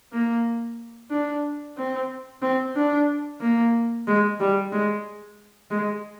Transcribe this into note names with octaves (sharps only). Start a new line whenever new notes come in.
A#3
D4
C4
C4
D4
A#3
G#3
G3
G#3
G#3